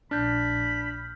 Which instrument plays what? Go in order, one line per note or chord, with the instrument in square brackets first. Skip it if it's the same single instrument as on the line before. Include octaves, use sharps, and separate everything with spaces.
[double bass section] A#1 [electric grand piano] D4 [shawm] B5 [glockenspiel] F6 G6 B6